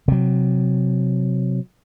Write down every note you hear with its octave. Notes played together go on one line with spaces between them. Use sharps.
C3 F#3